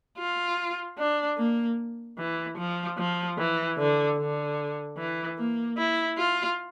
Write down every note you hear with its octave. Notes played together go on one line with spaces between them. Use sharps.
F4
D4
A#3
E3
F3
F3
E3
D3
D3
E3
A#3
E4
F4